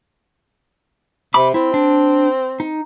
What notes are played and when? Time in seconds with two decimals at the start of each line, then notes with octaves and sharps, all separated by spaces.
1.34 C3 B5 D6
1.54 C4 E4
1.74 D4
2.60 D#4